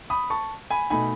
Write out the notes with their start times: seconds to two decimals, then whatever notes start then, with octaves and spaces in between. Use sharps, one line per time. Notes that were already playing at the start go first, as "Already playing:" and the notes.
0.10 B5 D#6
0.30 A5 C#6
0.70 G#5 B5
0.90 B2 A3 D#4 G#5 B5